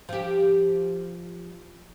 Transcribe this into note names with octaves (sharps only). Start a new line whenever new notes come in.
F3 G4